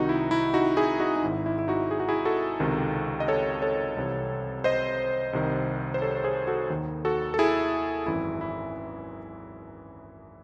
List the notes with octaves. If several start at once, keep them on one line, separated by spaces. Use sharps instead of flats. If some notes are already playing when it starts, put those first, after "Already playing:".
Already playing: C2 C3 D#3 D#4 F#4
E4
E4
D#4 F#4
E4 G#4
D#4 F#4
D#4
G#1 G#2 D#3 E4
E4
E4
D#4 F#4
G#4
F#4
E4 G#4
F#4 A4
C#2 C3 D#3
D#5
A4 C#5
A4 C#5
C2 C3 E3
C5 D#5
C2 C3 D#3
C5
A4 C#5
C#5
G#4 C5
F#4 A4
D#2 D#3
F#4 A4
A4
E4 G#4
G#1 F#2 E3 E4
E4